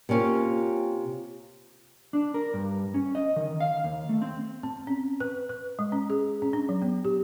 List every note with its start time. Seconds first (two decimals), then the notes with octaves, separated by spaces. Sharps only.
0.09 C3 A#3 C#4 F4
2.13 D4
2.34 A#4
2.54 G2
2.94 C#4
3.15 D#5
3.36 D#3
3.60 F5
3.84 D#2
4.09 A3
4.22 C4
4.63 C4
4.87 C#4
5.20 B4
5.49 B4
5.79 G#3
5.92 C#4
6.10 G#4
6.42 C#4
6.53 D4
6.69 F#3
6.82 B3
7.05 G4